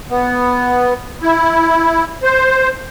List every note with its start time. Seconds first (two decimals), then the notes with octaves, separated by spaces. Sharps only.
0.11 B3
1.22 E4
2.23 C5